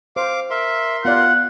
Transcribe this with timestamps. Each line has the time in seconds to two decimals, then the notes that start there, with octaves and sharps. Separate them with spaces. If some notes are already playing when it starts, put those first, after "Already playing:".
0.16 C5 F5 D6
0.50 A#4 E5 C6
1.05 B3 F4 D5 F#5 F#6